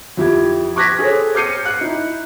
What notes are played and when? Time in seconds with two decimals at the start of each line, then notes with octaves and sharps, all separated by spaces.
0.17 F2 E4 G4 G#6
0.76 C#6 D6 F#6 G#6 A#6 B6
0.99 G#4 A4 C5 C#5
1.35 D6 F6 G6 C7 C#7 D#7
1.65 F#6 C#7
1.81 D#4 E4